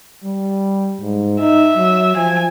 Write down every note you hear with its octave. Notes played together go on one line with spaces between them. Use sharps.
G3
G#2
D#4 E5
F#3
F3 G#5